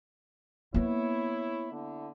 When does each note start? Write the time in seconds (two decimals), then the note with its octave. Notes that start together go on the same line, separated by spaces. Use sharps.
0.74 A#3 B3 E4 C#5
1.71 D3 E4